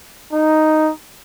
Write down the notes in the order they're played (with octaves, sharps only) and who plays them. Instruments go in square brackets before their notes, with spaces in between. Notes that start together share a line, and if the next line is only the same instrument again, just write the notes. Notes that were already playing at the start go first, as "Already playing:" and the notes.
[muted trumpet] D#4